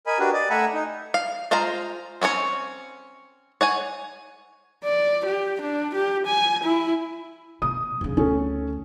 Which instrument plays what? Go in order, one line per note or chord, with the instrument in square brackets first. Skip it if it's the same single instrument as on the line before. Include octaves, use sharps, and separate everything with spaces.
[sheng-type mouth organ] A#4 D#5 G#5 B5
D4 F#4 G4 A#4 B4
D5 D#5
A3 E5 F#5 G#5 A#5 B5
D#4
[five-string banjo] F5
G#3 F4 C5 F5 A#5
C4 C#4 D#4 C#5
C#5 F#5 G#5
[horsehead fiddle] D5
G4
D4
G4
G#5
E4
[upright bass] B2 [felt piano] D#6
[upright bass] B1 C#3
[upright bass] D2 [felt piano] C#4 A4